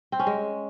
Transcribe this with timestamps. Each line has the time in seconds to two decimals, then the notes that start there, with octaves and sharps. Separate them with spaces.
0.12 C4
0.19 C#4
0.27 G#3